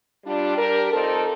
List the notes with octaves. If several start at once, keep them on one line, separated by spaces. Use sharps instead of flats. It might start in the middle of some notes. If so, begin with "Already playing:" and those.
G3 D4 F4
G3 D4 G4 A#4
F3 C4 D#4 A4